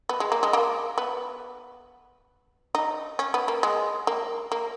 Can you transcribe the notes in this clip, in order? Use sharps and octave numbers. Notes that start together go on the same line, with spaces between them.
B3
G#3
A#3
G#3
A#3
B3
D#4
C#4
B3
A#3
G#3
A#3
A#3